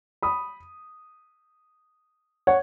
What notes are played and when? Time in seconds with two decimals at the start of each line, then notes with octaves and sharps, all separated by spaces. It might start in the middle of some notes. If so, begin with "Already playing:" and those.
0.22 B5 D#6
2.47 C#5 F#5